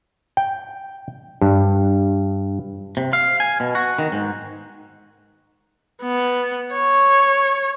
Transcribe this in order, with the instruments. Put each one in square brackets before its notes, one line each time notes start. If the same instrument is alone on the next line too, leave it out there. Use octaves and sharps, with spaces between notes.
[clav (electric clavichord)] G5
G2
[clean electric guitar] C3
F5
G#5
B2
F#4
D#3
G#2
[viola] B3
C#5